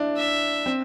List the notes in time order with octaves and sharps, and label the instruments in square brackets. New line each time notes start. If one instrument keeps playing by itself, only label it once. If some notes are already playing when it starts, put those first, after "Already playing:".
Already playing: [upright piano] D4 E4
[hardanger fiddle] E5
[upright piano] C4